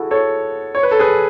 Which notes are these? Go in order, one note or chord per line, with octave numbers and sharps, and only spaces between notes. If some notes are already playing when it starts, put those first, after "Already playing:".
Already playing: E4 F#4 G#4 A4
A4 C#5
C#5
B4
A4
G#4 B4